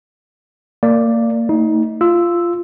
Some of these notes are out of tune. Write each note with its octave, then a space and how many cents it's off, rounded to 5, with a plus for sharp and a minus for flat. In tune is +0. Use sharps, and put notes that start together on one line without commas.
A#3 -25 D5 +0
A3 +35 D#4 +30
F4 -10 E6 +0